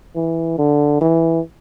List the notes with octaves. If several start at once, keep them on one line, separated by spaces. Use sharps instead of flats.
E3
D3
E3